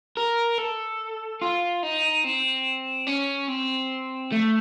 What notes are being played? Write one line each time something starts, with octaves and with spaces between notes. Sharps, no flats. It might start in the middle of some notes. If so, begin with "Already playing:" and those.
A#4
A4
F4
D#4
C4
C#4
C4
A3